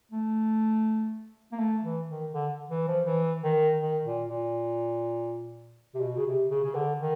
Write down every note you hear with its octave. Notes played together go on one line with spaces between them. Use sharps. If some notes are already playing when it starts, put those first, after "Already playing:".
A3
A#3
A3
E3
D#3
D3
E3
F3
E3
D#3
D#3
A#2
A#2
C3
B2
C#3
C3
C#3
C#3
D3
D#3